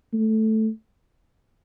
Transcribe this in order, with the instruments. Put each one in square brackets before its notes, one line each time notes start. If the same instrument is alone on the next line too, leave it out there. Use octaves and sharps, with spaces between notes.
[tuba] A3